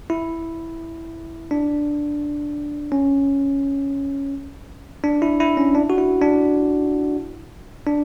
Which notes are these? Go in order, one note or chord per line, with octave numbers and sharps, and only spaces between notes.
E4
D4
C#4
D4
E4
E4
C#4
D4
F#4
E4
D4
D4